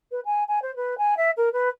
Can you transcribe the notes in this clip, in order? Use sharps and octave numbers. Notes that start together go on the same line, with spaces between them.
B4
G#5
G#5
C5
B4
G#5
E5
A#4
B4